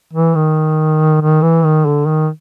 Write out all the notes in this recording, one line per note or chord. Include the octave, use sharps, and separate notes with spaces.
E3
D#3
D#3
E3
D#3
D3
D#3